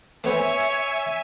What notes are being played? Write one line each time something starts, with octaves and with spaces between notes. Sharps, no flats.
A3 B3 C5 C#5 E5 G#5